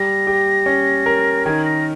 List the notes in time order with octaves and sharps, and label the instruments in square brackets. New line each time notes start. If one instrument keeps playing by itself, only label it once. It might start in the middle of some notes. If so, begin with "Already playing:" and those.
Already playing: [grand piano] G3 [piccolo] A#6
[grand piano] G4
C#4
A#4
[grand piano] D#3 [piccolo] G#6
[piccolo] A#6